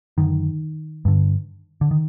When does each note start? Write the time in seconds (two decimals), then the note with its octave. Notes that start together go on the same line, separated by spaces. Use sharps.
0.18 F#2 D3 D#3
1.05 G2 D3
1.81 D3
1.91 D#3